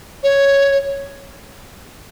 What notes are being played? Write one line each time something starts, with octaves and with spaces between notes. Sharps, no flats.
C#5